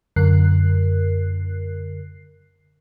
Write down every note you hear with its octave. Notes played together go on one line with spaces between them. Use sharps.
F#2 D3 A#4 F#6 C7